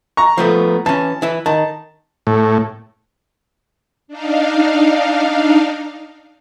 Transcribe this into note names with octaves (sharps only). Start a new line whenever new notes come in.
A#5 C#6
F3 A3 B3
E3 C#4 A5
E3 E4
D#3 A5
A2
D4 D#4 F5